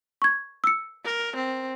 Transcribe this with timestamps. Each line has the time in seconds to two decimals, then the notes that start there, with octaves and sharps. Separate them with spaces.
0.22 C#6 G#6
0.64 E6 C#7
1.05 A#4
1.36 C4